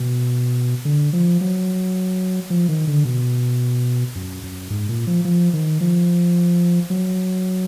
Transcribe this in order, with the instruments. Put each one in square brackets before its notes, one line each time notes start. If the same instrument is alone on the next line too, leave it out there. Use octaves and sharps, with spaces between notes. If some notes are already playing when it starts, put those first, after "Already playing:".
Already playing: [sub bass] B2
D3
F3
F#3
F3
D#3
D3
B2
F#2
F#2
G#2
A#2
F3
F3
D#3
F3
F#3